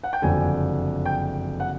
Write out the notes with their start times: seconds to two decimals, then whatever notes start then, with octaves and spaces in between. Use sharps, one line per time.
0.03 F#5
0.13 G5
0.22 F#1 F2 D3 G#5
1.06 G5
1.60 F#5